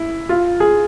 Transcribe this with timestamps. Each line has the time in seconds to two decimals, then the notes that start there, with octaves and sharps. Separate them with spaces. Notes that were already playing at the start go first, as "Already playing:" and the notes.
Already playing: E4
0.29 F4
0.60 G#4